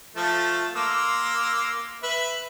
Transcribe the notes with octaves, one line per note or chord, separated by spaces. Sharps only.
F3 A3 A4
A#3 C6 E6
B4 E5